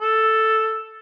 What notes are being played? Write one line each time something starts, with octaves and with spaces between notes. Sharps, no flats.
A4